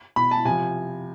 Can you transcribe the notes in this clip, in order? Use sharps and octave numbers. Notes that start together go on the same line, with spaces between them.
B2 B5
A5
C3 F3 G#5